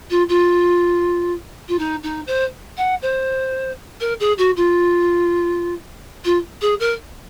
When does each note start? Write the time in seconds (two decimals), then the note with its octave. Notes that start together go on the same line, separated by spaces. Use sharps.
0.10 F4
0.29 F4
1.68 F4
1.79 D#4
2.03 D#4
2.27 C5
2.77 F#5
3.02 C5
4.00 A#4
4.20 G#4
4.38 F#4
4.56 F4
6.25 F4
6.61 G#4
6.80 A#4